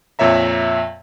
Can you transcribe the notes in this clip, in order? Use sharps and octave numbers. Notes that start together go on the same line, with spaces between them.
F2 A#2 C#5 E5 A#5